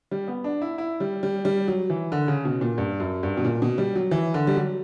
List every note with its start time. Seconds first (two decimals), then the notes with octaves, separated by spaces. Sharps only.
0.11 G3
0.28 B3
0.44 D4
0.62 E4
0.78 E4
1.00 G3
1.23 G3
1.45 G3
1.68 F#3
1.90 E3
2.12 D3
2.28 C#3
2.45 B2
2.61 A#2
2.78 G2
3.00 F#2
3.23 G2
3.37 B2
3.45 A#2
3.62 B2
3.78 G3
3.96 F#3
4.11 E3
4.34 D3
4.47 G3
4.56 F#3